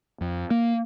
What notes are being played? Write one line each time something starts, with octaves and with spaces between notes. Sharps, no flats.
F2
A#3